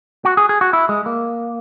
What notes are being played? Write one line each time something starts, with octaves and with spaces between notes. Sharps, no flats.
F#4
G#4
G#4
F#4
E4
G#3
A#3